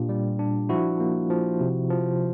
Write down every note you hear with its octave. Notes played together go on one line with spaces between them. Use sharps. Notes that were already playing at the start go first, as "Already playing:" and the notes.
Already playing: A#2 D4 F4 G4
G3
D4
F3 E4 F#4
A#3
F3
C3
F3